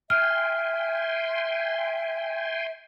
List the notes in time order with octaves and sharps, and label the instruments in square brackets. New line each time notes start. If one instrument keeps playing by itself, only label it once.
[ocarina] E5 [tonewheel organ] G5 G#5 C6 [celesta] F6